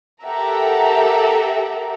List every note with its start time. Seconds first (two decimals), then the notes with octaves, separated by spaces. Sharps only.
0.23 G4 A4 A#4 E5 F#5 A#5